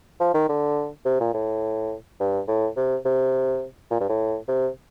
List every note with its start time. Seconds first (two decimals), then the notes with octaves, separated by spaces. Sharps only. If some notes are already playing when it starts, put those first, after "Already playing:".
0.20 F3
0.34 D#3
0.49 D3
1.05 C3
1.20 A#2
1.34 A2
2.20 G2
2.48 A2
2.77 C3
3.05 C3
3.91 A#2
4.00 G2
4.09 A2
4.48 C3